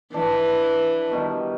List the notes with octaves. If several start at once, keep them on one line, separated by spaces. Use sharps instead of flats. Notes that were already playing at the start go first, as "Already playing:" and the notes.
E3 D4 E4
B2 D#3 G3